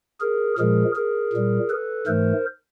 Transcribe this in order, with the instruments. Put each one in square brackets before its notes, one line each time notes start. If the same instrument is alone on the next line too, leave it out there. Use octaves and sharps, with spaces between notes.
[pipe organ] G#4 A#4
A#2 F3 G#3 G#4 A#4
G#4 A#4
A#2 G3
A4 B4
G#2 E3 A3 A#4 C5